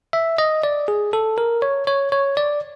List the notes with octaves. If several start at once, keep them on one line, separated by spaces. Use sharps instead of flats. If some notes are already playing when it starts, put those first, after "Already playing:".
E5
D#5
D5
G#4
A4
A#4
C#5
C#5
C#5
D5